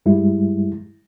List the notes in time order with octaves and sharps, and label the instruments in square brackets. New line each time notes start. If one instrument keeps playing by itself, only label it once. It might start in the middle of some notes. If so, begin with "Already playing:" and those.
[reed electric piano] G2 G3 G#3 E4